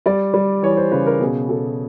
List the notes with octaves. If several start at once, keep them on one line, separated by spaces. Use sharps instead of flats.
G3 D5
G3
E3 C#5
C5
C#3 B4
A#4
B2 G#4
B2 A4